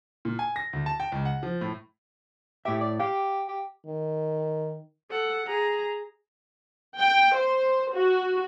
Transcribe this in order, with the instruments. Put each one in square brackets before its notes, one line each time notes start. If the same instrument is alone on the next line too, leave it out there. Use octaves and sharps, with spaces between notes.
[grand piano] A#2
G#5
A#6
D2
A5
G5
C#2
F#5
F3
A2
[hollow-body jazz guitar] A2 E5 [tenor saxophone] G4
[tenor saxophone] D5
[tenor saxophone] G4 [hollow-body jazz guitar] F5
[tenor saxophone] G4
[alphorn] D#3
[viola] A4 F#5
G#4 A#5
[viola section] G5
C5
F#4